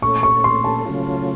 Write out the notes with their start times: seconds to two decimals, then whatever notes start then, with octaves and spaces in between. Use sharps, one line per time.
0.02 A#2 A3 C#4 A4 C#6
0.23 C#6
0.44 C6
0.64 A5
0.85 C#3 F#3 A3 C#4 F4